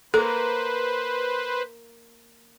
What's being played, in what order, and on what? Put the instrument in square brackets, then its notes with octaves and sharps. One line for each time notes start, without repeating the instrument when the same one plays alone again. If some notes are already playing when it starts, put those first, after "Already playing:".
[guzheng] A#3 [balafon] A4 [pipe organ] B4 C5